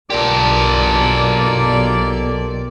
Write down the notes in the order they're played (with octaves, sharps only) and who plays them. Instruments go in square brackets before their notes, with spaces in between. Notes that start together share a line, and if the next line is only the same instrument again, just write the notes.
[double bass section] B1 [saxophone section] A#2 A#3 D5 [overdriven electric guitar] G4 A4